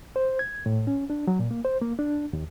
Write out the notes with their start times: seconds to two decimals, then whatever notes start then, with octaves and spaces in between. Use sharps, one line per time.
0.16 C5
0.39 G#6
0.66 A2
0.87 C#4
1.10 D4
1.27 F#3
1.39 A#2
1.51 A#3
1.65 C5
1.81 A#3
1.99 D4
2.33 D#2